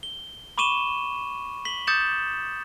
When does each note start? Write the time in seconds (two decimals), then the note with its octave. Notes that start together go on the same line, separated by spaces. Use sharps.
0.03 G7
0.58 B5 C#6 D6 D#7 E7 G7
1.65 B6 F#7 G7
1.87 D6 D#6 G6 A6 C#7 E7